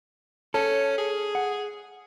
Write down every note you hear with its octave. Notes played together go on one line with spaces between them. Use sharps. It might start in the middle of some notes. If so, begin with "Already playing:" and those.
C#4 A4
G#4
F#5